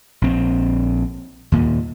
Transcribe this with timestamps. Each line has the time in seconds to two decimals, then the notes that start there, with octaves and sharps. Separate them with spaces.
0.22 A#1 C4
1.52 D#2 A#2